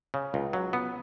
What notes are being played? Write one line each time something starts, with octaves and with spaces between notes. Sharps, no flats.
C#3
C#2
F#3
B3